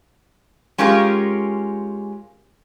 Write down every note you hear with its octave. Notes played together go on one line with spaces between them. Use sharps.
G#3 C#4 F4 G4 A#4